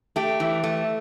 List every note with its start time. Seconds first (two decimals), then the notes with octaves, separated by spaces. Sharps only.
0.16 A3 G4
0.40 E3
0.64 A3